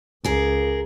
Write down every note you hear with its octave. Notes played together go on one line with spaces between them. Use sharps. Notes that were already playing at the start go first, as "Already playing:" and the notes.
C#2 G#4 A#4